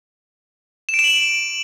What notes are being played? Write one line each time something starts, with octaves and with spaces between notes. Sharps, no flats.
E7
D7
E7
F#7
E7